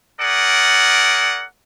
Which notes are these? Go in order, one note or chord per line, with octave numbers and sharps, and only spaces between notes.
G#4 A#4 D5 F#5